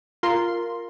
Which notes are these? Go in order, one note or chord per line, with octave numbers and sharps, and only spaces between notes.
F4 A#4 C6